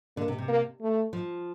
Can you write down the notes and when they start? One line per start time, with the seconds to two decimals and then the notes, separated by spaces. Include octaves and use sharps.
0.17 D3 A#3
0.28 C3
0.38 C3
0.48 A#3
0.81 A3
1.13 F3